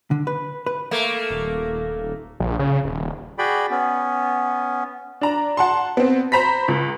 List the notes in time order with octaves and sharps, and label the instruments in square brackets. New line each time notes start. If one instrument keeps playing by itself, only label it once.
[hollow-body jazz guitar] D3
B4
B4
[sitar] A3 A#3
[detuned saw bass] D#1
A#1
C#3
D#1
[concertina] F#4 G#4 D5 G5 B5
B3 C#4
[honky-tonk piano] D4 A#5
F#5 A5 C6
B3 C4
C5 A#5 B5 B6
C#2